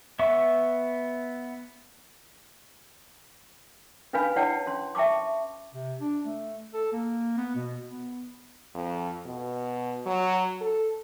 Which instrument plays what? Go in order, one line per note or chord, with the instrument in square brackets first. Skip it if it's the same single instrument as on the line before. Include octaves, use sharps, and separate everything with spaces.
[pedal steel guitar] B3 E5 C#6
[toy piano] C#4 D4 B4 F5 G#5 B5
D4 E4 C#5 F#5 G5 A5
C#4 C6
E5 G5 A5 C#6 D6
[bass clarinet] C3
D4
A3
A4
A#3
B3
B2
B3
[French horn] F2
B2
F#3
A4